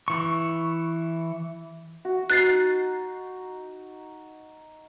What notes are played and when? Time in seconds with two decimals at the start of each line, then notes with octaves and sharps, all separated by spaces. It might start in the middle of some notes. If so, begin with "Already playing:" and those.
0.08 E3 C#6
2.05 F#4
2.30 D#4 F#6 A6 C7